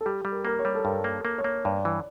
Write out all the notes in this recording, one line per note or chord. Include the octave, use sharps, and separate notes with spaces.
A4
G3 G4
G3
A#4
A#3 A#4
C#5
G3
A4
G2 A#4
A#3
A#3
C#5
A#3
G2 D5
E3